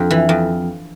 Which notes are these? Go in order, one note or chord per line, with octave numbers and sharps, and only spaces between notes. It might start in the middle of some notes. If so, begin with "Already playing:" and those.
Already playing: F2 D4
E3
F2